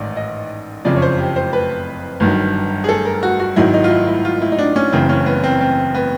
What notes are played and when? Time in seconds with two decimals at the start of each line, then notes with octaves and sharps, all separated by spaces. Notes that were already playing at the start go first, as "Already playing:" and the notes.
Already playing: A1 G#2 D#3 D5
0.17 D#5
0.85 F#1 F2 C#3 F3 D5
0.96 C#5
1.02 C5
1.18 G4
1.36 C5
1.53 B4
2.20 G1 G2 D#3 F#3
2.84 G#4
2.89 A4
3.05 A#4
3.23 F#4
3.40 F#4
3.56 G#1 G#2 D#3 F#3 E4
3.74 D#4
3.84 F4
3.91 E4
4.07 E4
4.25 F4
4.42 E4
4.52 D#4
4.59 D4
4.76 C#4
4.92 F#1 F#2 C#3 E3 C4
5.09 C#4
5.26 B3
5.44 C4
5.61 C4
5.94 B3